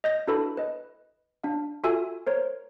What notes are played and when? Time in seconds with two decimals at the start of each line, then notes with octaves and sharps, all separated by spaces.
0.04 D#5 G6 A#6
0.27 D4 E4 F#4 A4 B4 B5
0.57 B4 D#5
1.44 D4 F5
1.84 F4 F#4 A4 E5 G#5 E6
2.27 A#4 C5 C#5